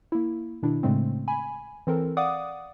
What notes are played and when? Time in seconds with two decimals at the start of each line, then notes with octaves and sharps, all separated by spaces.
0.12 A#3 E4
0.63 B2 D#3 D4 E4
0.83 A2 C#3 G#3 A3 C4
1.28 G#5 B5
1.87 E3 C4 A4 A#4
2.17 D5 F5 F#5 D6 D#6